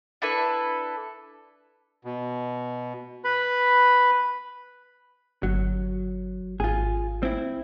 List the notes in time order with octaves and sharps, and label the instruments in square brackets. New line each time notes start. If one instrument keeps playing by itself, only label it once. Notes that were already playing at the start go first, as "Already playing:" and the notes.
[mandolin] D4 E4 A4 B4
[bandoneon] B2
B4 B5
[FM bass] G1 [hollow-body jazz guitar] F#3
[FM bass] G#1 [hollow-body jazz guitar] F4 G#4
[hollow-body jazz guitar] C4 E4